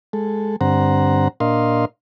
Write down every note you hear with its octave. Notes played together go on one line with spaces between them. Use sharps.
G#3 A4
G2 D3 C4 C5 F#5 A#5
A#2 D4 A#4 D#5 F5 C6